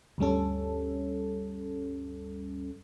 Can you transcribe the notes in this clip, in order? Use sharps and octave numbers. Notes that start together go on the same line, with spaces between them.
D2 G2 G3 C#4 A4